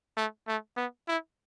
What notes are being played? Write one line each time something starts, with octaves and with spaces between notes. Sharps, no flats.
A3
A3
B3
E4